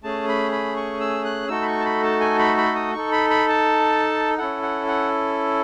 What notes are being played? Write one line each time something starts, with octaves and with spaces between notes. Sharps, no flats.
A3 C#4 G#4 A5
B5
B5
C#6
E6
F#6
A3 D#4 F#4 A4 E6
B5
C#6
A5
B5
A5
G#5
B5
B5
D#6
D#4 A4 C#6
B5
B5
A5
C#4 E4 A4 F#5
F#5
F#5